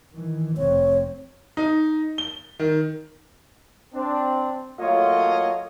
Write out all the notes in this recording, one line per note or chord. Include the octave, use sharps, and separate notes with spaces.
D#3 E3
F1 C4 C#5
D#4
G7
D#3
C4 D4
F#3 A3 A#3 F4 C#5 D#5